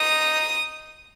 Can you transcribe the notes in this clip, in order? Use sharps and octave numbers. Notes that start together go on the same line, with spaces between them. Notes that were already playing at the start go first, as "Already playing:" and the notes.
Already playing: D#4 D#6